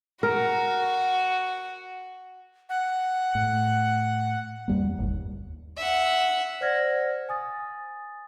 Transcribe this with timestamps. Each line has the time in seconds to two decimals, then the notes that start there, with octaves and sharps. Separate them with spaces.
0.23 F#4 A#4
2.69 F#5
3.35 A2
4.68 E2 G3 A#3
4.98 D1 G1 D#2
5.77 E5 F#5
6.61 C5 D5 F#5 F6 G#6 A#6
7.29 G#5 D#6 A6